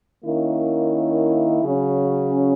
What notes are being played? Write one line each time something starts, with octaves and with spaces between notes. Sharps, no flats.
D#3 A#3 C#4 E4
C#3 F#3 C#4